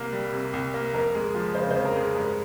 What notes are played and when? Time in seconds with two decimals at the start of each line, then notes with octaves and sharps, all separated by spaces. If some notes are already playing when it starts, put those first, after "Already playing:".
Already playing: C2 A#3
0.13 G3
0.33 C3
0.53 C2
0.74 A#3
0.94 F2 A#4
1.15 G#3
1.35 F3
1.55 C#3 C5
1.70 F2 C5
1.85 A#4
1.96 G#3
2.15 G2 A#4